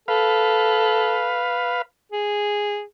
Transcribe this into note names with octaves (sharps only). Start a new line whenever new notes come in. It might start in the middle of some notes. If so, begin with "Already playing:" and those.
A4 B4 F5
G#4